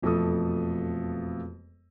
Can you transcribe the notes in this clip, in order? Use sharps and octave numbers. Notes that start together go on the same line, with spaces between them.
E1 F2 F3 A3 A4 D#6